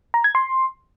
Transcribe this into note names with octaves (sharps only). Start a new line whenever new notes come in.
A#5
G#6
C6